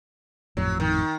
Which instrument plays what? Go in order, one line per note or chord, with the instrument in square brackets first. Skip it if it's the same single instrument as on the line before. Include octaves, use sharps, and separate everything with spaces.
[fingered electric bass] G#1 F2 A2 [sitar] F#3
[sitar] D#3